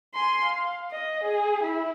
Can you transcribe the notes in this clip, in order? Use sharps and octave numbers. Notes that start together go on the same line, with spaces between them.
G#5 C6
F5
D#5
G#4
E4